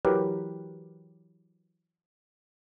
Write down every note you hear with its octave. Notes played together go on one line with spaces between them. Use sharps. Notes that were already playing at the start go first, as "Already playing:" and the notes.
E3 F#3 G4 A#4 B4